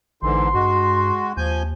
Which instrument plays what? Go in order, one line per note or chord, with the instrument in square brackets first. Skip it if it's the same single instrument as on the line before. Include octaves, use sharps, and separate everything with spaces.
[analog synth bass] A1 [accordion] G#2 D3 E3 [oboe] C6
[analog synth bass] G2 [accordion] G#3 F#4
[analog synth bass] D#2 [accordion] F3 G#5 G6